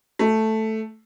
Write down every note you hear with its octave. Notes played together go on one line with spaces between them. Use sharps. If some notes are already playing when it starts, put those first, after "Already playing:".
A3